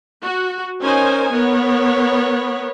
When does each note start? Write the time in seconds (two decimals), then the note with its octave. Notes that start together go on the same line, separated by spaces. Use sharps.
0.22 F#4
0.82 C#4 D#4 A#4 C5 G#5
1.32 B3 A#4 C#5